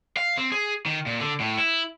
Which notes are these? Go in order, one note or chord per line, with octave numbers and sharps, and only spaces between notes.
F5
C4
G#4
D#3
A#2
D3
A2
E4